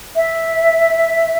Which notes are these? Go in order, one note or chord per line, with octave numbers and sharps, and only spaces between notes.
E5